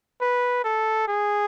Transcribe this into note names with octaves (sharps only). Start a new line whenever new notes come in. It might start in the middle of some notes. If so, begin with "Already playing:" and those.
B4
A4
G#4